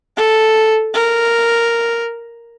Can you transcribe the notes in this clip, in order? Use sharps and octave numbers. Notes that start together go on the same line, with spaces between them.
A4
A#4